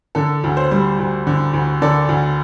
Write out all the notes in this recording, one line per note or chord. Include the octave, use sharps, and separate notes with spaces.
D3 A4
D2
C5
G3
D2
D3
D2
D3 A4 D5
D2